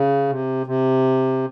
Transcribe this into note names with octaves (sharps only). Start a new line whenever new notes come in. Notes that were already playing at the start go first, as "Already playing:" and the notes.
Already playing: C#3
C3
C3